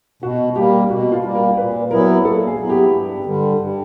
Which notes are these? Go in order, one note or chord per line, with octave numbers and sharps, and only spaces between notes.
B2 F#4
G3 A#3 G4
B2 F#4
F4
G3 A#3
A#4
A#2 B4
F#3 B3 E4 A#4
A#2 A4
G#4
F#3 B3 E4
G4
G2
D3 G3
G2